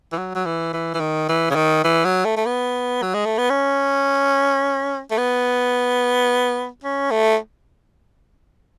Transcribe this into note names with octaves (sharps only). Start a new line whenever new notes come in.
E3
F#3
F#3
E3
E3
E3
D#3
E3
C#3
D#3
E3
F#3
A3
A3
B3
F#3
G#3
A3
B3
C#4
A3
B3
C#4
A3